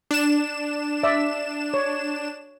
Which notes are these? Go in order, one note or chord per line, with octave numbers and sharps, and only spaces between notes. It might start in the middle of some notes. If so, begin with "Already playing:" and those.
D4 E7
D5 E5
C#5